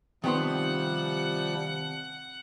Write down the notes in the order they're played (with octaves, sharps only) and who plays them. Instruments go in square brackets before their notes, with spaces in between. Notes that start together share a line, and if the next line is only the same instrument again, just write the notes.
[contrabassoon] C3 [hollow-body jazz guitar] D#3 B3 C6 [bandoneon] F3 G3 [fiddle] F#5